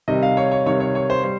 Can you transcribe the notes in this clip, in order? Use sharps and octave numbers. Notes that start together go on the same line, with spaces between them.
C3 D#3 G3 D#5
F5
C#5
C#5
C3 D#3 G3 C#5
C#5
C#5
C5
G3 C5